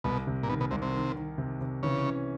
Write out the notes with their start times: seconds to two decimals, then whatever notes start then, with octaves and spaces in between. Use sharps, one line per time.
0.04 C2 B2
0.27 C3
0.43 A#2
0.48 B2 D#3
0.60 B2
0.71 C2 C3
0.82 C3
0.94 D#3
1.16 D#3
1.38 C3
1.61 C3
1.83 C#3 E3
2.06 C#4